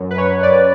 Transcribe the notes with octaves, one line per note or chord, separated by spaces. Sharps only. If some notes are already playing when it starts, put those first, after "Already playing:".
Already playing: F#2
B4
F#2 C#5
F#2 D5